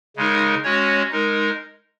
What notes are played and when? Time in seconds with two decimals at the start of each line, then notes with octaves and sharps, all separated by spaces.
0.16 C#3 G#3 D#4 A#4
0.63 G#3 C#4 F#4 C#5
1.11 G#3 D#4 A#4